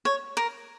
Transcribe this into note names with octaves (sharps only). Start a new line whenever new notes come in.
C#5
A#4